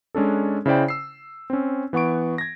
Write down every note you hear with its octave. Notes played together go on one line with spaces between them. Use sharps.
G#3 C#4 D4 A4
C#3 E4 C5 D5 G5
E6 C7
C4 C#4
E3 B3 F#5 C#6 D7
G#6 A#6